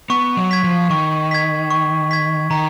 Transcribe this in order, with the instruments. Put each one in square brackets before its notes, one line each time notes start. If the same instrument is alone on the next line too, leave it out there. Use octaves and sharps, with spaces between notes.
[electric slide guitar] B3 [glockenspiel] C#6
[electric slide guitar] F#3
[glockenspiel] G#6 B6
[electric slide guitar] F3
[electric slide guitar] D#3 [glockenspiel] C#6
[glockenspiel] G#6 B6
C#6
G#6 B6
[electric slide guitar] D#3 [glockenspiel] A#5